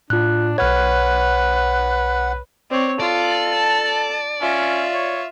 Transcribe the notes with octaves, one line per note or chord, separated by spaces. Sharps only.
A2 D4 F4 F#6
B1 B4 C#5 F#5 F6 G#6
C4 C#5 D5
F4 A4 D5
A5
C#4 F4 E5
C#5